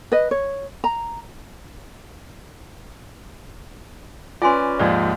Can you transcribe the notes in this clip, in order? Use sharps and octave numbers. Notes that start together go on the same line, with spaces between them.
B4 D#5
C#5
A#5
C#4 F4 B4 D5 G#5 C6
D#2 G#2 F3 D5